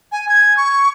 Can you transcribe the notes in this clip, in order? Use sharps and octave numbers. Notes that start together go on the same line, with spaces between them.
G#5
G#6
C#6